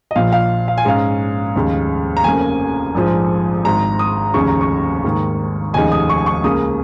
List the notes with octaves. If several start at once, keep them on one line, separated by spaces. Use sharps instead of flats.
D#5
A#1 A#2 F3 F5
F5
F5
G#5
G#2 G#3 C#4 F5
F1 D#2 C#3 G#3
A#5
F1 F2 C#3 A#3 C#4 G#5
A#1 G#2 F3
G#1 G#2 G#3 A#5
D#6
F1 D#2 C#3 G#3 C#6
A#5
C#6
G#2 D#3 A#3
F1 D#2 C#3 G#3 D#4 G#5
D#6
C#6
C#6
C#2 C#3 A#3 D#6